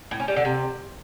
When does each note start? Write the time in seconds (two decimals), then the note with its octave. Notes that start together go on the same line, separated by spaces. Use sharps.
0.11 A2
0.20 C#4
0.28 G3
0.36 D3
0.45 C3